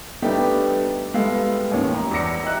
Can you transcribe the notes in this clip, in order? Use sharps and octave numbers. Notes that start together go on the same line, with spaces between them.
G3 A3 B3 D4 D#4 G4
G3 G#3 B3 E4 A4 F5
A1 D#2 D#3 C#4
A#5
E2 D5 E6 A#6 C#7
G4 D#5 E5 A#5 F#6